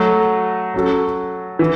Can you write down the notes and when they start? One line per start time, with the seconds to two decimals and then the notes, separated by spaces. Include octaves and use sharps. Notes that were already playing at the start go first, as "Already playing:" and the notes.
Already playing: F#3 A3 F#4
0.74 F#3 C#4 F#4 A4
1.59 E3